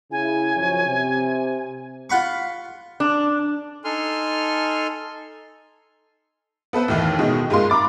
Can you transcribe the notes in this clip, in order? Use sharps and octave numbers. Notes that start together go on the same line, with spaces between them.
C#3 E4 G#5
F#2 F3 C#5
C3
F4 F#5 B5 C#6
D4
D#4 A4 G#5 C6 F6
B3 A4 B4 C5
D#2 A2 D#3 E3
B2 D#3 G#3
G#2 G#3 A#3 F4 C6
A#5 B5 D6 A6